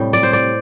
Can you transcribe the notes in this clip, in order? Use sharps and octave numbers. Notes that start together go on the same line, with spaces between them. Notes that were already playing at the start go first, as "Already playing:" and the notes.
Already playing: A2 C3 G3
D5
C5
D5